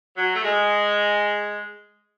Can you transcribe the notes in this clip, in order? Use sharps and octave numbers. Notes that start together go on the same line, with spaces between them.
F#3
A3
G#3